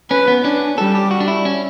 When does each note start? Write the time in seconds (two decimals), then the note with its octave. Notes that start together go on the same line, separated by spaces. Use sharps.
0.10 C#4 B4
0.28 B3
0.44 C#4 D4
0.78 G3 A4
0.95 G4
1.11 F#4
1.20 D4
1.28 E4
1.45 C#4